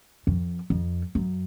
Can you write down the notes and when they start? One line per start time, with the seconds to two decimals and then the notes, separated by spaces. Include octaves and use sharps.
0.27 F2
0.70 F2
1.15 F#2